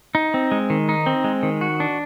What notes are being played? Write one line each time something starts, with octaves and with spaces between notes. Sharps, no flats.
D#4
C4
G#3
D#3
D#4
C4
G#3
D#3
F#4
D4